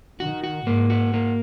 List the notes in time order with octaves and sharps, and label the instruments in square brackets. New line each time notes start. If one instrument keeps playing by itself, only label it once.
[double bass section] D#3 [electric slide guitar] F#4
[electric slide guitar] F#4
[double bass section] G#2 [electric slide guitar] A#3
[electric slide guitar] F#4
A#3